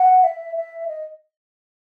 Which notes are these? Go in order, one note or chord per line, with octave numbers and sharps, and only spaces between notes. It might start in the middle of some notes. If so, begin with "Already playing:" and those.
Already playing: F#5
E5
E5
D#5